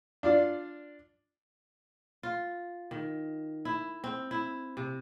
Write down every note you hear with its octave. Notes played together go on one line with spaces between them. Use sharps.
D4 F4 D5
F4
D#3
E4
C4
E4
C3